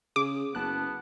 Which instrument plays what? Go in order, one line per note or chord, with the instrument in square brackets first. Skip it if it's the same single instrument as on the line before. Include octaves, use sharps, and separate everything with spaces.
[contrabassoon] C#3 [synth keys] G#4 [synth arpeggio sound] D6
[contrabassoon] F#1 [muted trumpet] B3 [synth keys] A5 F#6